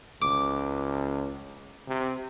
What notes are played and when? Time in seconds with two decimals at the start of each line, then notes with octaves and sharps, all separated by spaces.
0.22 C#2 D6
1.88 C3